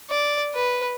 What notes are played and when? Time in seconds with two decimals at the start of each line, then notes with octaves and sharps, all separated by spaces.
0.10 D5
0.54 B4